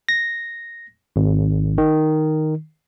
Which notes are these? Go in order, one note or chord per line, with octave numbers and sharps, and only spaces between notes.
A#6
G#1
D#3